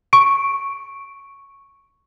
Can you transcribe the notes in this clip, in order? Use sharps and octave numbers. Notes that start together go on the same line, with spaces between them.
C#6 D7